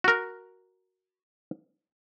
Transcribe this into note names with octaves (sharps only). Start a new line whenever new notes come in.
F#4 A#4